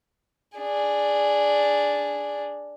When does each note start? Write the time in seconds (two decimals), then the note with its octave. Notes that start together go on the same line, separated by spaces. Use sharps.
0.58 D4 G#4